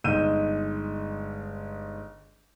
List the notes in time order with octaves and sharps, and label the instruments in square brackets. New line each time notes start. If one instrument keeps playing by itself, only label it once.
[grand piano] G1 G#3 D#4 E6 G6 D#7